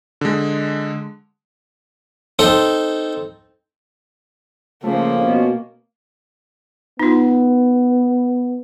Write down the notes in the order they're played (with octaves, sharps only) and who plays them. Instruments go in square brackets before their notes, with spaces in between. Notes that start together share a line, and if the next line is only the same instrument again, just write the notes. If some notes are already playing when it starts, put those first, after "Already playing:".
[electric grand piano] D3 G#3
[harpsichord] C4 D#4 A4
[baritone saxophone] C#3 [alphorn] F3 [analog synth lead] A3 [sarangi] A#3
[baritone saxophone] B2 [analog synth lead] C#4
[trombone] B3 [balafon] D#4 F4